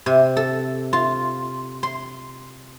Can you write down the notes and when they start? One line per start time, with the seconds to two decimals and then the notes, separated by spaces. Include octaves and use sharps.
0.06 C3
0.37 A4
0.93 F4
1.83 C6